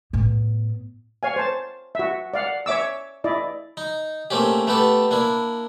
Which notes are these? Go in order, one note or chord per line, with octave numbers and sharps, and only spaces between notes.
A2 B3
C#5 F5 G#5
C5 A5
F#4 E5
D5 F5 F#5
C#5 E5 D6 E6
E4 D5 D#5
D#4
A3 A#3 C4 C#4 G4
A3 B3 G4 A4
A#3 D4 E4